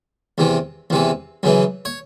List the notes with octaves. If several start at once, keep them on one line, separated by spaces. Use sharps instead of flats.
E2 C3 E3
E2 C3 E3
F#2 C#3 E3
C#5